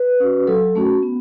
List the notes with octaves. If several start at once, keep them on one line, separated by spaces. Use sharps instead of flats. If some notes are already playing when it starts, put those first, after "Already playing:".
Already playing: B4
C#4 F#4
F#3 A4
A3 C#4 F#4
B3